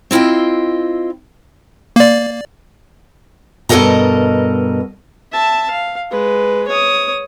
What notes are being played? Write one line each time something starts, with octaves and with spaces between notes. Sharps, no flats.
C4 E4 F4 D#5 G5
A#3 D5
G2 B2 A4 A#4 D#5 A#5
E5 A5
F5
G#3 B4
C#5 D#6